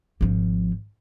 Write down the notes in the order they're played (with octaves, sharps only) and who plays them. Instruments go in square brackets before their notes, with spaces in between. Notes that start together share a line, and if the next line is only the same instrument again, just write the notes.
[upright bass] G#1 F3